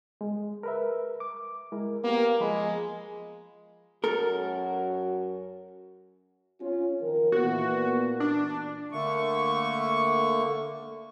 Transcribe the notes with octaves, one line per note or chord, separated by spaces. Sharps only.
G#3
A#4 B4 E5
D6
G#3 E4 A#4
A#3 B3 G4
F3 G#3 B5
F#2 F#4 A4 A#4
C#4 F4
D#3 F3 A#4
A#2 E3 B3 F#4
D4
D3 A3 A#3 C#6